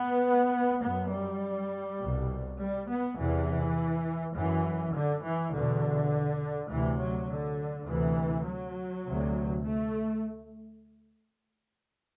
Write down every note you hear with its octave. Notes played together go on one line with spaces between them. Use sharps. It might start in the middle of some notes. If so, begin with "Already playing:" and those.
Already playing: B3
F#2 B3
G3
C2 B2
G3
B3
E2 C3 E3
F#2 E3
D3
E3
E2 B2 D3
D2 C3 E3
F#3
D3
D2 C3 E3
F#3
D2 C3
A3